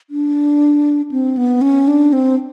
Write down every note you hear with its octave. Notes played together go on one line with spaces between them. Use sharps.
D4
C4
B3
C#4
D4
C4